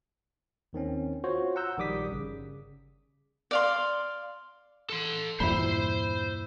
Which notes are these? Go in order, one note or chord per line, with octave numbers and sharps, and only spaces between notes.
D#2 D#3 C4 C#4
F4 F#4 C5 C#5
F#5 A#5 E6 G6
A#1 D#3 G3 D6 D#6 B6
G1 C#3
D5 F5 C6
A4 C6
E2 G2 A#2 E4 C5 B5